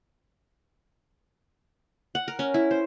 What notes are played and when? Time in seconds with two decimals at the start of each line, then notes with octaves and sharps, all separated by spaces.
2.15 F#5
2.28 A#4
2.39 C#4
2.54 E4
2.71 C5